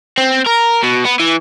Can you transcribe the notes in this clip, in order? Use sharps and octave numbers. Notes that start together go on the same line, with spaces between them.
C4
A#4
B2
B3
E3